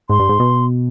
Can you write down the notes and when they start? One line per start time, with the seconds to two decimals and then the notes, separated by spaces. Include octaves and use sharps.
0.10 G#2 C6
0.20 G2
0.29 G#2
0.40 B2